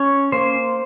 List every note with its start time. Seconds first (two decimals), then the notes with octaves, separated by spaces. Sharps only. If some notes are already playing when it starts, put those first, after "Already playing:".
Already playing: C#4 C#5
0.32 A#3 C5